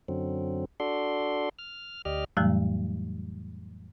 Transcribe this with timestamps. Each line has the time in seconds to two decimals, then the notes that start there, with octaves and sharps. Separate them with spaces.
0.08 F#2 D3 F#3 C4
0.80 D4 F#4 A4 D5 C6
1.59 F6
2.05 D2 G4 D5 D#5 F6
2.37 F2 A2 E3 F#3 G3 A3